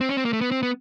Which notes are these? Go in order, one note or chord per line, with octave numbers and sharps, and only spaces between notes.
C4
C#4
C4
A#3
A3
B3
C4
B3